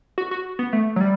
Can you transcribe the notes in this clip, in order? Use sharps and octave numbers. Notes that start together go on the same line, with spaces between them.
F#4
F#4
B3
A3
F#3
G3